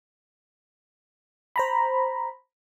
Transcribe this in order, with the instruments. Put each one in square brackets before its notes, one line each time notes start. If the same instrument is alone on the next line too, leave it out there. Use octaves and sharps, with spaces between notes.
[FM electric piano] C5 A#5 B5